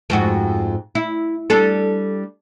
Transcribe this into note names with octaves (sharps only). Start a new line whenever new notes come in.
F2 G#2 F#4
E4
G3 D4 A4